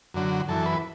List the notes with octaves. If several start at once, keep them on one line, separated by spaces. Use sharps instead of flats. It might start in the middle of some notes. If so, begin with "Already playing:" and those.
F#2 D3 F#3
F#2 E3 A4
B4